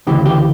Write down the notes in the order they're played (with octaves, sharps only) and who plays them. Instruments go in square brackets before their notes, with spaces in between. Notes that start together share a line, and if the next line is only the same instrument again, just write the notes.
[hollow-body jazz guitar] D2 C#3 E3 G4
G4